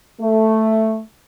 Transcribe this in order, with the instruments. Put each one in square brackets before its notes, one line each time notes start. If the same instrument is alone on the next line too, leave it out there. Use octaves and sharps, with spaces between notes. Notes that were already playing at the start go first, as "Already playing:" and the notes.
[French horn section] A3